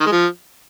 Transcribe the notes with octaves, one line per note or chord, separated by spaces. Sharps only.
D#3
G#3
F3